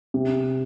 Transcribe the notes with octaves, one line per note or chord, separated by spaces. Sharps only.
C3